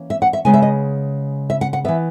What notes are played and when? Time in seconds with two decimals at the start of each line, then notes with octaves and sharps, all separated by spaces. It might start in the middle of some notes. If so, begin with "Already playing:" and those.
Already playing: E3 A#3 C#4
0.10 E5
0.22 F#5
0.33 E5
0.45 C#3 G#3 B3 G#5
0.54 E5
0.62 D#5
1.50 E5
1.61 F#5
1.73 F#5
1.84 E3 B3 E5